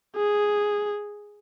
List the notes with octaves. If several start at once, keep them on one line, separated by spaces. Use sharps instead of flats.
G#4